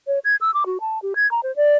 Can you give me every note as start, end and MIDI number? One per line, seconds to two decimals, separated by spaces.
0.07 0.19 73
0.25 0.36 92
0.41 0.54 88
0.54 0.64 86
0.66 0.78 66
0.81 1.01 81
1.02 1.14 67
1.16 1.29 92
1.31 1.41 82
1.43 1.54 72
1.56 1.77 74